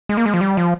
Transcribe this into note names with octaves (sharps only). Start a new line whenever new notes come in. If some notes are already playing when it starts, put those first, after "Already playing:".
G#3
A#3
G#3
F3
G3
F3